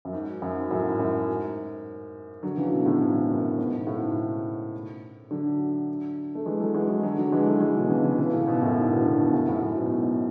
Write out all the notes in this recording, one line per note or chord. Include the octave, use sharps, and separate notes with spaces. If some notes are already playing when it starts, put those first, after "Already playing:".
F#2
G#2
F#2
G#2
F#2 A2
G#2
F#2
G#2
D3 F#3
C#3 E3
B2 D3
A2 C#3
G#2
G#2
F#2
G#2
G#2 B2
G#2 B2
A2 C#3
G#2
D3 F#3
A3
E3 G#3
F#3 A3
E3 G#3
E3 G#3
G#3
D3 F#3
D3 F#3
E3 G#3
F#3 A3
E3 G#3
B2 D3
C#3 E3
C#3 E3
C#3 E3
A2 C#3
G#2 B2
F#2 A2
G#2
B2 D3
B2 D3
G#2 B2
F#2 A2
F#2 A2
F#2 A2
G#2 B2
G#2 B2